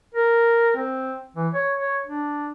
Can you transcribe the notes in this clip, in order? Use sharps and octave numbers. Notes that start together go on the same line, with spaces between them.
A#4
C4
E3
C#5
C#5
D4